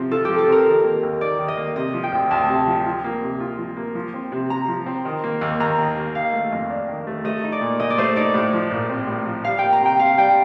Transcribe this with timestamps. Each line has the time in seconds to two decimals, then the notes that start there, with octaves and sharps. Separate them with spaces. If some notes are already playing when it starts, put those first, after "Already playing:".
Already playing: C3 F3 C4
0.11 F4 A4
0.25 F3 G4
0.38 A4
0.48 C4 A#4
0.66 D#3
0.84 A#3
1.03 D#2
1.21 D#4 D5
1.39 D#3
1.48 D#5
1.57 A#3
1.76 C3 D#5
1.94 F3
2.03 G5
2.12 D2
2.31 D2 A5
2.48 C3
2.68 F3
2.86 F3
3.04 A#3
3.22 C3
3.40 F4
3.59 F3
3.77 A#3
3.95 F3
4.14 C4
4.32 C3
4.50 C3 A#5
4.68 F3
4.86 C4
5.05 D#3
5.24 A#3
5.41 D#2
5.60 D#2 A#5
5.79 D#3
5.97 A#3
6.15 D#3 F5
6.33 A3
6.52 F2
6.70 D4
6.88 D#3
7.07 A3
7.25 A3 D#5
7.44 D#4
7.52 D5
7.61 A#2
7.80 A#2 D#5
7.90 D5
7.98 A3 C5
8.16 D#4 D5
8.34 A2
8.53 F3
8.71 A#1
8.89 C4
9.08 A2
9.27 F3
9.44 G3 F5
9.59 A#3 G5
9.72 A#5
9.81 C3 G5
9.99 C3 F5
10.18 G3 G5